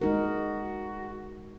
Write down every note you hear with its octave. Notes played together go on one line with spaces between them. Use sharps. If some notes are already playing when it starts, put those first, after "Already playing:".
G#3 D#4 F#4 A#4